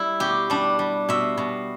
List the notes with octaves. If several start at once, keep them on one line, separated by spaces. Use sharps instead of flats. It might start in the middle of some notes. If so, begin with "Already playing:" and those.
Already playing: G3 E4
B2 G4
G3 D4
G3
B2 E5
B2